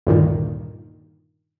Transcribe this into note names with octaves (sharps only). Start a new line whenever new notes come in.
D2 G2 A#2 D#3